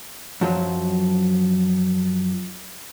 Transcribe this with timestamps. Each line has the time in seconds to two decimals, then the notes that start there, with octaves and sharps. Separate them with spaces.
0.41 F#2 F3 F#3